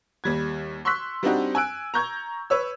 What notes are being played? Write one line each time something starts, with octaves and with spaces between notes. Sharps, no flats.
D#2 G3 G#6
C6 C#6 E6 F#6 B6
G3 C4 D4 D#4 F#4 G4
G#5 E6 F#6 D7
A#5 C#6 G6 G#6
B4 C#5 E6